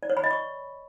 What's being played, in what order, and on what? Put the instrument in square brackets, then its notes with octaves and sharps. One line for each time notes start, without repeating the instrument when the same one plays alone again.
[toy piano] D5
C#5
B5
D#5
C#6